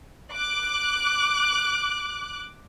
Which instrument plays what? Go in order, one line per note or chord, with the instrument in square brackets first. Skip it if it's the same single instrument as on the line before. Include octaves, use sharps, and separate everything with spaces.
[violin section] D6 F#6